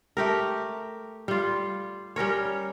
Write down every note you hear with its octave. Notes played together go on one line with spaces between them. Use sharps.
A3 G4 A#4
G3 F4
G3 C#4 A#4 C#5